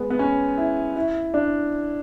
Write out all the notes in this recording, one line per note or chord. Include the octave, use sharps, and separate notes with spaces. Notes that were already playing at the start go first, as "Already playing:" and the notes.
Already playing: G#3 B3
B3
C#4
E4
E4
D4